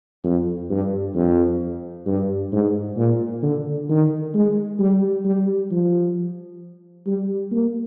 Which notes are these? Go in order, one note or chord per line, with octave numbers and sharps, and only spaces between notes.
F2
G2
F2
G2
G#2
A#2
D3
D#3
G#3
G3
G3
F3
G3
A#3